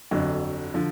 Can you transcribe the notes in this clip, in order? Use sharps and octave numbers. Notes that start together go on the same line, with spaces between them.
G1 F2 D3 F#3
D3 F3